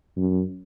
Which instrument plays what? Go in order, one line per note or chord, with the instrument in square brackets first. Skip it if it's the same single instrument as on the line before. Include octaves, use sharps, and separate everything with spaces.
[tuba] F#2